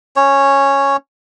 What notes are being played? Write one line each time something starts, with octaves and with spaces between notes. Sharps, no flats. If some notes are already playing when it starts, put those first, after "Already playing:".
C#4 C#5